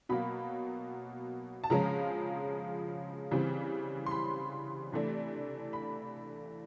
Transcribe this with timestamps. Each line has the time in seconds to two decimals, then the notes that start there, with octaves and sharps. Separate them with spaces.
0.09 B2 F#3 A#3 B5
1.64 A5
1.70 C#3 F3 G#3 C#4 A#5
3.31 C#3 E3 G3 C4
4.06 C6
4.11 B5
4.92 C3 E3 A3 D4
5.73 B5